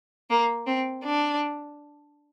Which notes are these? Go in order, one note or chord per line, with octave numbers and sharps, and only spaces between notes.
A#3
C4
D4